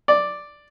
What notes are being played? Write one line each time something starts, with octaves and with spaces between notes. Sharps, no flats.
D5